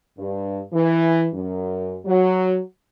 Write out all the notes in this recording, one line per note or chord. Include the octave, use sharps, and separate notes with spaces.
G2
E3
F#2
F#3